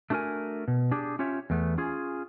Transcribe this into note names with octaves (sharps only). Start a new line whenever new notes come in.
A3 D4 F#4 G#4 A#4 G#5
B2
D4 G4 G#4
C#4 F4 G4 C#5 E5
E2 A3 B3
C#4 F4 G#4